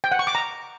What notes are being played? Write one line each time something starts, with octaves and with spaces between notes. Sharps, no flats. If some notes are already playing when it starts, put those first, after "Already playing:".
G5
F#5
C#6
D6
A#5